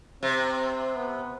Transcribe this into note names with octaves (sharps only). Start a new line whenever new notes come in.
C3 C4
B3